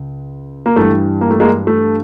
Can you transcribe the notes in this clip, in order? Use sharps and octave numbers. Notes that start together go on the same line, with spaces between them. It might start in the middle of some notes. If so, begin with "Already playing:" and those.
Already playing: C#2
A#3
G2 E3 G3 A3
A#3
A3
G#3 A#3
A3